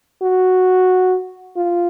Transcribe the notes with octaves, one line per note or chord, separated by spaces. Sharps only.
F#4
F4